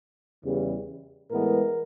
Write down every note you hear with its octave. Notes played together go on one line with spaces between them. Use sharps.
E2 C#3 E3 G3
A2 E3 G#3 B3 A#4